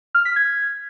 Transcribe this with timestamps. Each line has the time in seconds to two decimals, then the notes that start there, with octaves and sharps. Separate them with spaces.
0.15 F6
0.25 B6
0.36 G#6